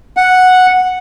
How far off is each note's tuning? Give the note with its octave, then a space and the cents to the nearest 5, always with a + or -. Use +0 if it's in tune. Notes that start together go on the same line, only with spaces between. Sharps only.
F#5 -5